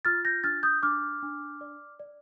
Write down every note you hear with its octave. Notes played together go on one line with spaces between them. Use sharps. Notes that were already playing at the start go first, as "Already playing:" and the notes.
F4 F6 A6
G6 A#6
D4 F6 A6
D#6 G6
D4 D6 F6
D4
D5
D5